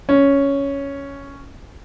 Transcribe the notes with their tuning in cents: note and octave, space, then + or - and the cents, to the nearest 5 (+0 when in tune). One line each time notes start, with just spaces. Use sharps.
C#4 +5